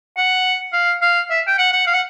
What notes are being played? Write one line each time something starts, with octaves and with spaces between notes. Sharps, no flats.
F#5
F5
F5
E5
G5
F#5
F#5
F5
F#5